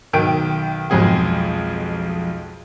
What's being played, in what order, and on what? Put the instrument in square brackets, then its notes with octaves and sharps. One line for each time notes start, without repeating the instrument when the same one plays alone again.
[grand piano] B1 D#3 G5 D7
B1 F2 G#3 G#4 G5